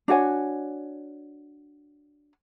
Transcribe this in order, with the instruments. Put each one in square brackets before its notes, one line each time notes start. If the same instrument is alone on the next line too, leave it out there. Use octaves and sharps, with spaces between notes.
[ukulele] D4 F#4 C#5 G#5